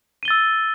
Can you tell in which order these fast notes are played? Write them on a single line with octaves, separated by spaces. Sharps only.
D#7 G7 A6 E6